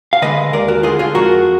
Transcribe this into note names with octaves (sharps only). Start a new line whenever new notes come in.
F5
D3 G#3 B4 D#5
D#2 A#4 D5
F#4 A#4
D3 G#3 F4 G#4
F4 G#4
F2 F#4 A#4